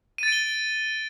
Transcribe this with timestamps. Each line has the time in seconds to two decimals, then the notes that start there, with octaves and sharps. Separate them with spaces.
0.18 D#7
0.23 A6
0.28 D7
0.32 G7